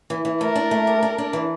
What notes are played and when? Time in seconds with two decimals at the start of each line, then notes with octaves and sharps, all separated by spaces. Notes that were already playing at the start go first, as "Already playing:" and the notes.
0.10 E3
0.25 E3
0.41 A3 A#4
0.56 D4
0.71 A3
0.87 G4
1.02 D4
1.18 D4
1.33 E3